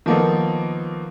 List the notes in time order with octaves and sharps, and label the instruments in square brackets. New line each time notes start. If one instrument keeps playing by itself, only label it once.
[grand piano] D#3 F3 A#3 B3 D#4 A4